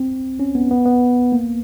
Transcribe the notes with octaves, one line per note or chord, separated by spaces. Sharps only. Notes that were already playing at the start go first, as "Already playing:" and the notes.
Already playing: C4
C#4
B3
B3
B3
A#3